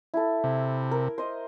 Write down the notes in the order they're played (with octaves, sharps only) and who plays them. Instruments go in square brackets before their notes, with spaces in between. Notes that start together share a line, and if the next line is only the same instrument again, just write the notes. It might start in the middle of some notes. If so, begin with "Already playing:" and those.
[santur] E4 A4
[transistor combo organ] C3
[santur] A#4
C5 D#5